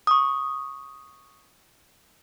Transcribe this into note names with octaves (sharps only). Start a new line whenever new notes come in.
C#6 D#6